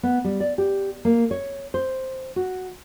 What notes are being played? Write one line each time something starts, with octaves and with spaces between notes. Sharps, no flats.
B3
G3
D5
G4
A#3
C#5
C5
F#4